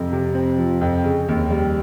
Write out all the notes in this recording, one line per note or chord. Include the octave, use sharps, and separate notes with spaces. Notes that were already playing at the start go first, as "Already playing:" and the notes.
Already playing: F2 C3 F3 C4
C3
C4
F3
F2
C#3
D#2
G3